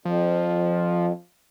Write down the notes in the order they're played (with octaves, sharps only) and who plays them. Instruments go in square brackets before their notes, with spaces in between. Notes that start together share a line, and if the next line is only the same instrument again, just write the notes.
[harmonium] F2 [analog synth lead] F3